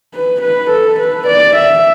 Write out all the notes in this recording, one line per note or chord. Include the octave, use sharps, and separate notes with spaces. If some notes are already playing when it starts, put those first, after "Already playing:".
B4
B4
A4
B4
D5
E5